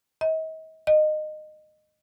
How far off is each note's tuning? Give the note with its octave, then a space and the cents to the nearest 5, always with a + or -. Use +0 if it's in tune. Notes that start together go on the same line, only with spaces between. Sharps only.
D#5 +40
D#5 -20